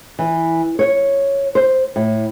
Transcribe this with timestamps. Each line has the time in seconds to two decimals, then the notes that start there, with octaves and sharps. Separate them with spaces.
0.19 E3
0.79 C#5
1.55 C5
1.96 A2